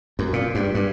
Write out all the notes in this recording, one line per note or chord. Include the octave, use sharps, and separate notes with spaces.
F#2
A#2
G2
G2